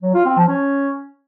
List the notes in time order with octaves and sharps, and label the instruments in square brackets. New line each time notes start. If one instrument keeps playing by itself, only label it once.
[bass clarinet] F#3
F4
C4
F3
C#4